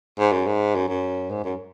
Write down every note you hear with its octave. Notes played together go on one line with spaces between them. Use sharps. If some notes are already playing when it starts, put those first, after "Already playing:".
G#2
F#2
G#2
F#2
F#2
G#2
F#2